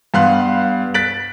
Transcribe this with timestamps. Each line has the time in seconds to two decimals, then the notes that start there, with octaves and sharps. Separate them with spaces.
0.14 G2 B3 F5 C6 F#6
0.94 F#6 A6 B6 D7 F#7